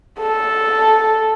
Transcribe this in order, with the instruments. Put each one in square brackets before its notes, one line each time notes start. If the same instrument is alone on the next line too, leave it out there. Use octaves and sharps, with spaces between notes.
[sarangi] A4